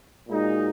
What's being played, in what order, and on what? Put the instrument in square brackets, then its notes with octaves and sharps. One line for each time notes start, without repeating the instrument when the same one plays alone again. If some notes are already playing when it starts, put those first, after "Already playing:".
[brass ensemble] A#2 G#3 D#4 F#4